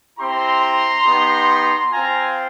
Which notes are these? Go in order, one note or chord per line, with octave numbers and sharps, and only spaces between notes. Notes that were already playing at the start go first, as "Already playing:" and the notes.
C4 E4 G4 A#5 C6
B3 D#4 G4
C4 F4 G#5 A#5